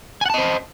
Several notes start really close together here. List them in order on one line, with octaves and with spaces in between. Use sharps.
G#5 F#5 A5 D#5 C5